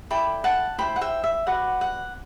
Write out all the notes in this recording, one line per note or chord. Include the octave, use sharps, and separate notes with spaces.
E4 A4 D5 G5 B5
F#5 A5
E4 G4 C5 G5 B5
F#5
E5 G5
E5
F#4 B4 D5 F#5
F#5